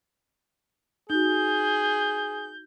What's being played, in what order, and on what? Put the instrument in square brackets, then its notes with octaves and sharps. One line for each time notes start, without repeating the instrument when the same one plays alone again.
[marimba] D#4 F#4 [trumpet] G#4 [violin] G6